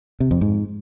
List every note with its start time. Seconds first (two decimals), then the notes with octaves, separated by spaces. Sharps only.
0.20 C3
0.31 F2
0.41 G#2